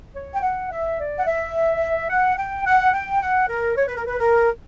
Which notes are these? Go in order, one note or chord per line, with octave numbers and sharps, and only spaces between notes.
C#5
G5
F#5
E5
D5
F#5
E5
F#5
G5
F#5
G5
F#5
A#4
C#5
B4
A#4
B4
A#4